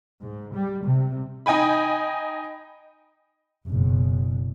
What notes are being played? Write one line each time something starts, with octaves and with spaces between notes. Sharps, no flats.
G#2
G3
C3
D#4 D#5 G5 G#5 B5
F#1 B2